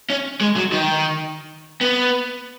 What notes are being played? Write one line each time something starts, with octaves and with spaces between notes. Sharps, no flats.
C#4
G#3
F#3
D#3
B3